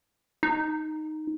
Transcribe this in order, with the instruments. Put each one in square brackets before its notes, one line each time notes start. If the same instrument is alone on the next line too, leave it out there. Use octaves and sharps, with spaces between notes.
[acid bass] D#4